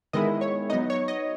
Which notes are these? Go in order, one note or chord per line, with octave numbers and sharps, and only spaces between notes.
D#3 G#3 B3 E4 D#5
C#5
F#3 B3 D#4 D#5
C#5
D#5